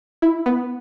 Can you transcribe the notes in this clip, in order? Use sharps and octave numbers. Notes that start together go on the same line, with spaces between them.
E4
B3